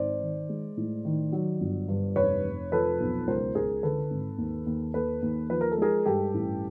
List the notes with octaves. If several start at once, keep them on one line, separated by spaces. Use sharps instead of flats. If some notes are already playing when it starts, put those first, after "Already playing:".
Already playing: G#1 C5 D5
D#3
G#3
A2
D#3
F#3
G1
G2
F1 B4 C#5
F1
F3 A4 B4
B1
C#2 A#4 C5
C#2 G#4 A#4
D3 A4 B4
G#1
D#2
D#2
D#2 A4 B4
D#2
F3 B4
A#4
A4
G#3 G#4 A#4
G2 G4 A4
A1